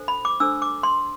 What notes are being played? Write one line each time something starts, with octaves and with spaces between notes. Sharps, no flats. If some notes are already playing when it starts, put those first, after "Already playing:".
Already playing: D4 A4 C5
B5
D6
D4 A4 C5 E6
D6
C6